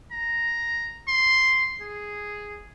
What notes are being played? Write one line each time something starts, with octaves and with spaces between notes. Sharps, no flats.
A#5
C6
G#4